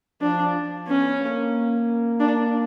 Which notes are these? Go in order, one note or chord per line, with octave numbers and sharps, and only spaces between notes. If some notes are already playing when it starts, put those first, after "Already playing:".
F3 D4
B3 C#4
A#3
D4